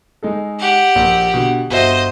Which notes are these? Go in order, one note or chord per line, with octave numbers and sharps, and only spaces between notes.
G#3 D#4 A4
G4 F#5
A#1 A#3
B2 D3
G1 F#4 C5 D#5 E5